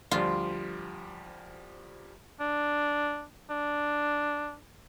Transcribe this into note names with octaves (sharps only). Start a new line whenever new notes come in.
D2 F3 G3 F4
D4
D4